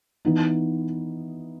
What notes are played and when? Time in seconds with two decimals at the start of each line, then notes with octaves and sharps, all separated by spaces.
0.25 E3 B3 D#4